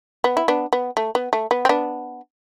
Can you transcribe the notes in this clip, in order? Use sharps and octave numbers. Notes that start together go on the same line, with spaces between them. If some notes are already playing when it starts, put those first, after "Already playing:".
B3
E4
B3 D4
B3
A3
B3
A3
B3
C4
B3 D4